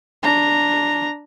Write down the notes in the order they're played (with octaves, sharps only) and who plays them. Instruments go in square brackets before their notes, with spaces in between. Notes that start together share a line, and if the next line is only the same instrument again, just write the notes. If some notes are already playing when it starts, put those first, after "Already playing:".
[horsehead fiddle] D4 A#5